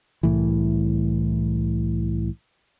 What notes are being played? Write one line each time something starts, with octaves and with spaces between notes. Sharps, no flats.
C2 A2 E3